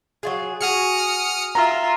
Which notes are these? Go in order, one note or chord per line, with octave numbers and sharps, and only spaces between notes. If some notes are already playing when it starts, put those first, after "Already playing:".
F#3 F4 G#4
F#4 G#4 D#6 F6 C#7
F4 E5 A#5